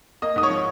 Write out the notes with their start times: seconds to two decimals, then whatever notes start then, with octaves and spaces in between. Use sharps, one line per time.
0.22 A#3 D#5 D#6
0.36 G#2 D#6
0.43 C#5 C#6
0.50 F3